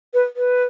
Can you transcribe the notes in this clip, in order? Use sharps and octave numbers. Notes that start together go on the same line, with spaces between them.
B4
B4